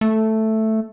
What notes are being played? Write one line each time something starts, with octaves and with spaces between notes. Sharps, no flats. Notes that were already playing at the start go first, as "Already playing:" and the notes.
A3